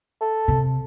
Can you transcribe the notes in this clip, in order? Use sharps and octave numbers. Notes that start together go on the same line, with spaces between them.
A4
C3